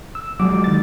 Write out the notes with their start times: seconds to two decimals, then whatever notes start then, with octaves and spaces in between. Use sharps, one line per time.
0.15 E6
0.40 F#3 G#3 D6
0.64 D#3 A6